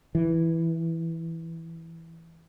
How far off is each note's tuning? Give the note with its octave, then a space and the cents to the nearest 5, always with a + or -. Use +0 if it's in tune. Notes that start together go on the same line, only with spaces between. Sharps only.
E3 +0